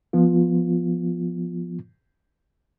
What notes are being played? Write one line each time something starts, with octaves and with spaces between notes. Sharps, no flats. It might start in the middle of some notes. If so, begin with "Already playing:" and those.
F3 B3 F4